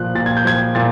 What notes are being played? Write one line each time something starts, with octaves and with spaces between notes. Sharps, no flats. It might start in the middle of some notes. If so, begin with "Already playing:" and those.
Already playing: A#2 F3 F#6
A#2 A6
G#6
G6
F3 G#6
A#2 A6